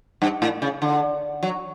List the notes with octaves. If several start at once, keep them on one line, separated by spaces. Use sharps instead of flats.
G2
A2
C#3
D3
F#3